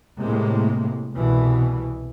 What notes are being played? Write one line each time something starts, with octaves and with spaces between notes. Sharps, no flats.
A2 C3 G#3 A#3
C2 B2 E3